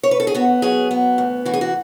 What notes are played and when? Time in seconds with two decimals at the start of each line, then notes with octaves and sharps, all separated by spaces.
0.03 C#5
0.11 B4
0.20 A4
0.27 G#4
0.35 B3 F#4
0.62 F#3 G#4
0.91 B3
1.18 D2
1.45 E3 F#4
1.54 G#4
1.61 F#4